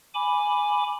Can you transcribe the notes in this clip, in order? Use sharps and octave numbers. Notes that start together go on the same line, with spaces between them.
G#5 B5 D6